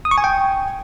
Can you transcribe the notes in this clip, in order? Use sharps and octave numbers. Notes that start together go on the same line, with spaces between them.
D#6
C#6
G#5
G5